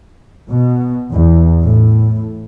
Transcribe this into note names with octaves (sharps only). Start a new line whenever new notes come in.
B2
E2
A2